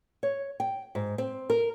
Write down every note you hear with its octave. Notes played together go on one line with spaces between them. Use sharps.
C#5
G5
G#2
C4
A#4